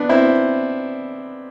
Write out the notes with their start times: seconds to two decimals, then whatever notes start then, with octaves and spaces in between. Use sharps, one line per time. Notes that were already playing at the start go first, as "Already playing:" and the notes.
Already playing: B3 D4
0.09 C4 E4